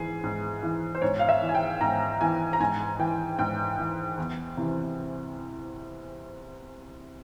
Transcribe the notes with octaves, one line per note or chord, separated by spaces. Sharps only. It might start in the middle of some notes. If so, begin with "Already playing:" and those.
Already playing: G#2 E3 G#4
G#2
E3
C5
G#2 C#5
F5
E5
E3
G#5
G5
G#2 A#5
E3 G#5
A#5
G#2 G#5
E3 G5
G#2 G5
E3
E2
C3 E3